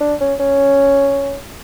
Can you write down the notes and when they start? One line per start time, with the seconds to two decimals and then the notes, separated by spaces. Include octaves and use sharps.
0.01 D4
0.21 C#4
0.40 C#4